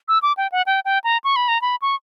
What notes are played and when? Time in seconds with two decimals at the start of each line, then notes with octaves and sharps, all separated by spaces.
0.08 E6
0.23 D6
0.37 G5
0.52 F#5
0.66 G5
0.85 G5
1.04 A#5
1.24 C#6
1.36 B5
1.48 A#5
1.62 B5
1.82 C#6